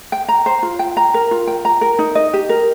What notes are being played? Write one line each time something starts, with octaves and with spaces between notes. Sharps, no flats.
G5
A#5
C5
F4
G5
A#5
A#4
F4
G5
A#5
A#4
D#4
D#5
G4
A#4